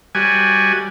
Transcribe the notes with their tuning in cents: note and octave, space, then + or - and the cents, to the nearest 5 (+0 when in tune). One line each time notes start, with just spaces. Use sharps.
G3 +0 F#4 +0 G#5 +0